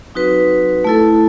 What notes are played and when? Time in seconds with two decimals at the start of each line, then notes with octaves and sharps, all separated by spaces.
0.14 F#3 C4 D#4 F#4 B4
0.84 A3 E4 A4